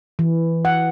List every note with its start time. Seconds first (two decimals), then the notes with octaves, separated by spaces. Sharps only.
0.19 E3
0.65 F#5